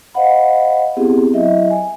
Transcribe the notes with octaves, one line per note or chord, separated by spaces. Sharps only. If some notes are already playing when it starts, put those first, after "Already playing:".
C5 D#5 F5 F#5 B5
B3 C4 E4 G4 G#4
F#3 E4 D#5 E5
G#5